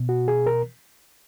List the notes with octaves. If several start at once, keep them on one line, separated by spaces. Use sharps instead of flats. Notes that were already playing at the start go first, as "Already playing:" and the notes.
Already playing: B2
F#4
G#4
A#4